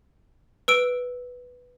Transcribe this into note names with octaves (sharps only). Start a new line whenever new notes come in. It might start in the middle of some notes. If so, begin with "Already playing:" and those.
B4 E6 D7